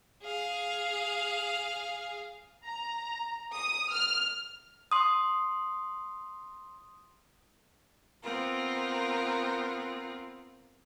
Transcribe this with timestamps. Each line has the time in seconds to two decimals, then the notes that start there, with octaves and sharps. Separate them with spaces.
0.23 G#4 F5
2.66 A#5
3.55 D#6
3.92 F6
4.92 C6 D#6
8.22 B3 C4 F4 A#4